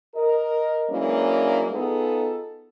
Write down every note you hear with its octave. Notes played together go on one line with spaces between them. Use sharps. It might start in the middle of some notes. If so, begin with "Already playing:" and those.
A#4 D#5
E3 F#3 G#3 A#3 C#4 D4
B3 D#4 F4 G#4 A4